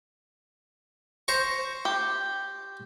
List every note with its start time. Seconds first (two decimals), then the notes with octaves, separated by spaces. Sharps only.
1.28 C5 A#5 C#6
1.85 G4